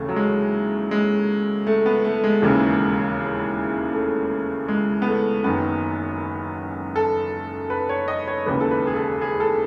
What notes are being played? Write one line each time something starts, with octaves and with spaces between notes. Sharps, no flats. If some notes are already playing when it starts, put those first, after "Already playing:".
Already playing: D#2 C#3 E3 A3
F#3
G#3
G#3
A3
B3
A3
G#3
E1 D#2 C#3 E3
A3
G#3
B3
A3
F#1 F#2 D#3 B3
A4
B4
C#5
D#5
C#5
E1 D#2 C#3 E3 B4
A4
B4
G#4
A4
G#4
A4